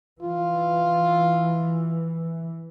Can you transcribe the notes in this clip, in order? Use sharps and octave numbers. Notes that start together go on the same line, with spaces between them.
E3 F4